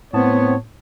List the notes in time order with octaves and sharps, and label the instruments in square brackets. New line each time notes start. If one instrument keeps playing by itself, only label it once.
[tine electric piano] A2 A5 [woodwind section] B3 [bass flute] C4 [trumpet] C#5